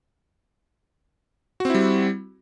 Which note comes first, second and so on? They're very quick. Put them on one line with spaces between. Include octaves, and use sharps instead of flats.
F#4 C4 E4 G3